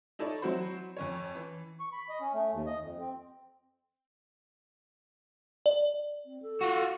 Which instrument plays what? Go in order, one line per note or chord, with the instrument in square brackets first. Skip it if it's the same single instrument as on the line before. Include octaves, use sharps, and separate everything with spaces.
[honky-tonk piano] D#4 E4 A4 C#5 D5
F#3 C4 E4 F#4 C5
F2 C#4 C#5
E3
[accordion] C#6
B5
D#5
C#4
A3
D#2
D#5
F2
C4
[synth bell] D5
[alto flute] C4
A4
[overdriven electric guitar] F4 F#4